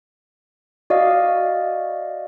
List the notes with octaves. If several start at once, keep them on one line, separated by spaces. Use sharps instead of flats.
F#4 D5 D#5 F5